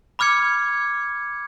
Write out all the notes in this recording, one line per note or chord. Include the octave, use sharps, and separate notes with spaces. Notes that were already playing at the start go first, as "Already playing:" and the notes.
B5 D6 F6 G#6 C#7